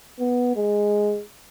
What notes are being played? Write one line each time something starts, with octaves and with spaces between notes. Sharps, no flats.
B3
G#3